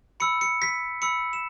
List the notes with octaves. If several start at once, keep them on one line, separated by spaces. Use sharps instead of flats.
B5 E6 C#7
C#7
B6
B5 E6 C#7
E7